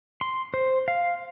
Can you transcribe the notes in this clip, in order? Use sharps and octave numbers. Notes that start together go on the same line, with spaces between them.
C6
C5
F5